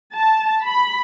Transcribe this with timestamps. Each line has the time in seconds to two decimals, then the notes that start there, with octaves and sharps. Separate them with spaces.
0.15 A5
0.63 B5